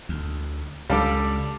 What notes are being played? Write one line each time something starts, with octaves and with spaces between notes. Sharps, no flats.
D2
C#2 G3 D4 A4 F5 A5 D6